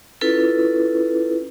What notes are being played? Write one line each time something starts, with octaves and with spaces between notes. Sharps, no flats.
C#4 E4 F4 A4 B4